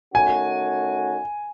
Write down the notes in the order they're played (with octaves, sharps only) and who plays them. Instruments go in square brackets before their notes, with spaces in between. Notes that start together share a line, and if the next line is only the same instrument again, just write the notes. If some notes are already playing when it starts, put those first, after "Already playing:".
[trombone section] D#3 A3 C#4 F#4 [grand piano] G#5